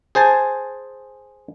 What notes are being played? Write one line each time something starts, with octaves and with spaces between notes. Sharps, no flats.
G#4 C5 G#5 A5